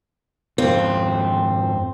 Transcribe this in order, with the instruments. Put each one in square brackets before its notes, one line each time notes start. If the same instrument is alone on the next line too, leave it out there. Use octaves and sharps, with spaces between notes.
[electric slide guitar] F2 G#2 F4 [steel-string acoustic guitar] C4